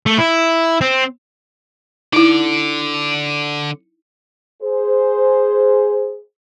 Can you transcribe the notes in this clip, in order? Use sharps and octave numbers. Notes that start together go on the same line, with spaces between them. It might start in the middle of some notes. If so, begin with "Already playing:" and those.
A3
E4
C4
D3 D#4 E4 D5
G#4 C5